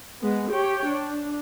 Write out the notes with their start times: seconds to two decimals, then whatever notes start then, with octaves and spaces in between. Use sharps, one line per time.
0.21 G#3 B3
0.51 G4 C#5 G5
0.87 D4